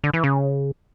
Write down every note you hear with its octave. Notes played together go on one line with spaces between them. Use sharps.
D3
E3
C#3